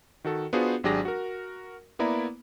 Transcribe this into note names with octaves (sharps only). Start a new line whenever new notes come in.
D#3 F#4 A4
B3 D4 F4 F#4 G#4 C5
G#1 F#3 D4 G4 G#4 A#6
F#4 A#4
A#3 B3 E4 D5 A#5 B5